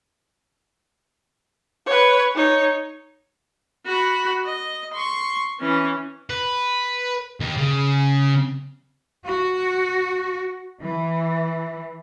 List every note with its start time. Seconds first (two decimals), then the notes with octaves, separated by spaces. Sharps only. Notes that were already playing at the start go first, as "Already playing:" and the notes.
1.86 B4 C#5
2.35 D#4 C#5
3.86 F#4 B5
4.45 D#5
4.94 C6 C#6
5.60 E3 C#4
6.30 B4
7.40 D#2
7.57 C#3
9.28 F#4
10.80 E3